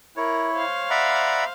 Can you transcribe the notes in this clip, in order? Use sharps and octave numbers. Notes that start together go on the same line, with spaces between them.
E4 A#4 C#5
C5 F5
D5 E5 F#5 A#5 B5